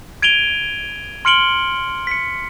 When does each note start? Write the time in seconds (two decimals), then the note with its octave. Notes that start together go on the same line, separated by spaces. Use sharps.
0.22 G#6 D7 D#7 F7 G7
1.25 C6 F6 C#7 D7 F#7 G7
2.07 B6 C#7